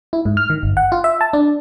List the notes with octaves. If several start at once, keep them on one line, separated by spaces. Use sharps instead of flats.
E4
G#2
F6
D#3
G1
F#5
F4
E5
A5
D4